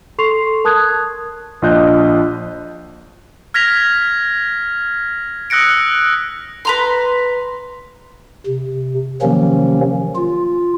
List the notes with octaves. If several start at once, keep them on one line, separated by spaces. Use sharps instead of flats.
A4 C6 C#6 C7 F7
A#4 A5 D#6 F#6 G#6
A#1 D4 F4 D#5 F#6 G6
F6 G#6 A#6 B6 F7
D#6 E6 F#6 A#6 C#7 D7
B4 A#5 C6
C3
C3 D#3 F3 F#3 A#3 C#4
F4